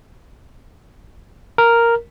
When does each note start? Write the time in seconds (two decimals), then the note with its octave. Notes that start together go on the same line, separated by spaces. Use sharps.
1.58 A#4